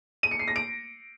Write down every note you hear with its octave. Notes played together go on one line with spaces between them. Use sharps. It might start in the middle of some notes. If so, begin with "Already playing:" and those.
D#7
C#7
C7
A#6
D7